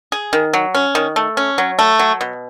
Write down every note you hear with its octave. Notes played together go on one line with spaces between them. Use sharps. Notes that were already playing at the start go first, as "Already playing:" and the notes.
G#4
D#3
F#3
C#4
D#3
A3
C#4
F#3
A3
F#3
B2